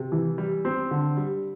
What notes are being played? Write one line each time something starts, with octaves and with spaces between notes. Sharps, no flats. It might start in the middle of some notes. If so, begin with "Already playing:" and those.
Already playing: C3
E3
G3
C4
D3
G3